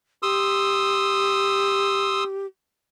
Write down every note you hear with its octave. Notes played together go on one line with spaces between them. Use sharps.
G4 C6 D#6 E6